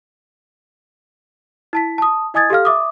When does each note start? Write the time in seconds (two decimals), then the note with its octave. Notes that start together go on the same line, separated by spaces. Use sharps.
1.73 E4 A5 B6
1.98 A5 D#6
2.34 E4 D#5 G#5 D#6 G#6 A6
2.50 G4 A4 F5 F6
2.65 E5 D6 D#6